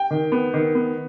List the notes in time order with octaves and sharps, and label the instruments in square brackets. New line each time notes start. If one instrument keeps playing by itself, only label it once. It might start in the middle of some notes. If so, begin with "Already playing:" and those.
Already playing: [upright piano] G5
D#3
B3
D#3
B3